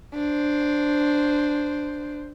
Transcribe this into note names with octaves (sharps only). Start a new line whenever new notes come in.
D4 C5